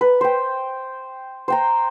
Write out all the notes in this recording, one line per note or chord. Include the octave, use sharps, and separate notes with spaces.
B4
C5 G5
C5 G5 A#5